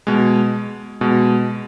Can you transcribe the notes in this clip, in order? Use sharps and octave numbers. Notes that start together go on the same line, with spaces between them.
B2 G#3
B2 G#3